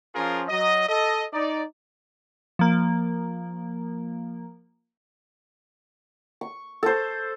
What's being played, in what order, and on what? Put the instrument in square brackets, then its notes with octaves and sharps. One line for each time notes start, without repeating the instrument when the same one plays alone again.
[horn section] F3 C#4 F4 G#4 A#4
F#3 D#5
A4 D#5
D#4 D5
[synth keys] F3 A#3
[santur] C#6
A4 C5